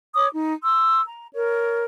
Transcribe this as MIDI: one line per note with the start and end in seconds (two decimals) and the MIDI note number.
0.15 0.26 73
0.15 0.26 86
0.15 0.26 87
0.33 0.52 63
0.64 1.00 84
0.64 1.00 88
1.07 1.28 82
1.33 1.84 70
1.33 1.84 73